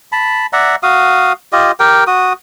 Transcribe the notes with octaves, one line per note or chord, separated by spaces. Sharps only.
A5 B5
D5 E5 F#5 A#5
F#4 F5 D#6
F4 G4 D#5
G4 A#4 G5
F#4 D#6